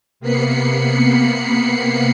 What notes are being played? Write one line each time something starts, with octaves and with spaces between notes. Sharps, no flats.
C3 A#3 B3 B5 C7 C#7